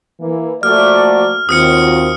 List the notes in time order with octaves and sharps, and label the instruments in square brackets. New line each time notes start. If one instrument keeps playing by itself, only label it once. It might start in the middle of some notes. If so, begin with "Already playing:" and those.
[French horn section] E3 A#3
[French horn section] F3 A#3 F#4 [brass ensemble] A3 D5 [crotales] F6
[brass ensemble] D#2 [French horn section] C4 F4 F#4 [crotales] D#6 F6 C#7